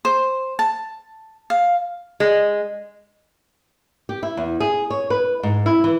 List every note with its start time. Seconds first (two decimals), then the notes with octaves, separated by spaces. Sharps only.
0.05 C5
0.59 A5
1.50 F5
2.20 G#3
4.09 G4
4.23 E4
4.37 E2
4.60 G#4
4.90 C#5
5.10 B4
5.43 G#2
5.66 E4
5.84 E3